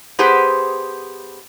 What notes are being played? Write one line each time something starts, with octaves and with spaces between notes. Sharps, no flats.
B3 G4 G#4 C5